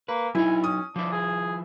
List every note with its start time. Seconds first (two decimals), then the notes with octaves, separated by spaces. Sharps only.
0.08 A#3 B4
0.35 F#3 D#4 E4 G#5
0.64 C#4 D#6
0.96 F3 D4 E4
1.12 G#4